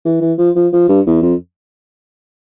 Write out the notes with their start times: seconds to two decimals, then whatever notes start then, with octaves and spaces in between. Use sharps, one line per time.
0.05 E3
0.21 E3
0.38 F3
0.56 F3
0.73 F3
0.89 G2
1.07 E2
1.22 F2